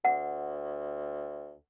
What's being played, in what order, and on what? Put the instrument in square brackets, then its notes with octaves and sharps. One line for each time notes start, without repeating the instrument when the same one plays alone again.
[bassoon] D2 [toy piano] F#5